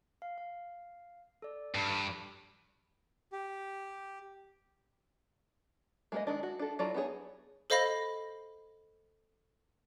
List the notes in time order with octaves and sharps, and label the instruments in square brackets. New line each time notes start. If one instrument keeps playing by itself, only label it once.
[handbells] F5
F5
A4 D5
[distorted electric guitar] G2 [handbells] A5 B5
[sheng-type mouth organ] G4
[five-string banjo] G#3 A#3 G#4 B4 D#5
D#3 G#3 D4
F#4
D4 A4
F#3 E4 F4 A4 D5
B3 D#4 E4 G#4 C#5
[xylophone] A4 C5 D#5 F5 B5 A#6